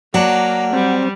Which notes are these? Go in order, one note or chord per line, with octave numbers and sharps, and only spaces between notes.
F#3 A#3 D4 F#5
G3 C4